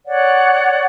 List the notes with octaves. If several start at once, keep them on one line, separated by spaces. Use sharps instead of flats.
C#5 D5 F#5